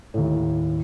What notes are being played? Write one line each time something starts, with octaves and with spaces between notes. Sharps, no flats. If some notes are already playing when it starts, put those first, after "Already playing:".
D#2 A2